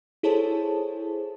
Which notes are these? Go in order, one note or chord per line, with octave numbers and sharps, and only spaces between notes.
E4 G#4 A4 C5 C#5 A5